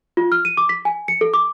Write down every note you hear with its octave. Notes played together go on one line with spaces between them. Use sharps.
F4
F6
D#7
D6
B6
G#5
C#7
A4
D6